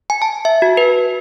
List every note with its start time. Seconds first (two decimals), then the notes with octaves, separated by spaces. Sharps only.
0.10 G#5
0.22 A5
0.45 E5
0.62 F#4
0.77 B4